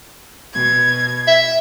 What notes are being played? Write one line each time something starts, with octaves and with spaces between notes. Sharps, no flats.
B2 G#6
E5